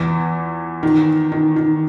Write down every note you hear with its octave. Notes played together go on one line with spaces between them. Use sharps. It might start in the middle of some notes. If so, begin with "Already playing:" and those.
Already playing: E2 E3
D#3
D#3
D#3